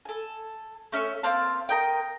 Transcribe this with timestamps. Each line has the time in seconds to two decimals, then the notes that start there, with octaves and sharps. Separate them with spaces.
0.05 A4 G#5
0.92 A3 C#4 E5
1.23 A#3 C4 F5 A5
1.69 A#4 D#5 G5